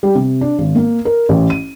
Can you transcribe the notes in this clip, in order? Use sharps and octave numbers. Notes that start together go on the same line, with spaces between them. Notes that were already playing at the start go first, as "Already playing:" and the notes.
G3
C3
D4
G#1
A#3
A#4
A1
D#7